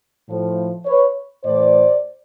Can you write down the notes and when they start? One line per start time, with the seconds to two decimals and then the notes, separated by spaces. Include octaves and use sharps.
0.29 A2 F3
0.86 B4 C#5
1.44 A2 E3 C5 D5